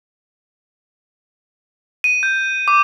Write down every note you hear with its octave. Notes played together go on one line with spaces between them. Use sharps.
D#7
G6
D6